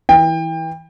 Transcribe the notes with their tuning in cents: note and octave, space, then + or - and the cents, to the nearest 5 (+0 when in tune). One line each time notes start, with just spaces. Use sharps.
E3 -15 G5 +30